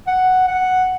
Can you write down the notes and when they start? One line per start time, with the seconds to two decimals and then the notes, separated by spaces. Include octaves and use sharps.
0.07 F#5
0.48 F#5